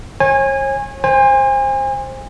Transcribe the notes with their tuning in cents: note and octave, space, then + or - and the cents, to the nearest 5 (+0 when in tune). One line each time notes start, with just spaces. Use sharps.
C#5 -40 G#5 -20
C5 +15 G#5 -35